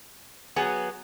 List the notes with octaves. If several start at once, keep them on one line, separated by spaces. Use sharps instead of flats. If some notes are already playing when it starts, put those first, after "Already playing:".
F#3 B3 G#4